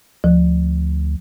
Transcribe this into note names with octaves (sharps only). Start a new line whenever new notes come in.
D2 F3